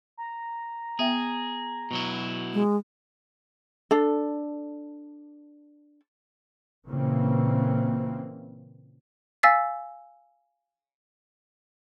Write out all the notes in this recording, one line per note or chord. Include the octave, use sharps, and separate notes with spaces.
A#5
B3 G#4 E5 G5
B2 F#3 E4
G#3
D4 A4
A#2 C#3 E3 A#3 C4
F5 G#5 E6 A6 B6 C7